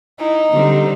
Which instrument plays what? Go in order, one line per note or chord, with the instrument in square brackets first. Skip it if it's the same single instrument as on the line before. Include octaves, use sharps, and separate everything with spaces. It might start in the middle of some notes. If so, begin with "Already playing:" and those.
[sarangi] D#4 [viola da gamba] E4
[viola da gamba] D3 G3 C4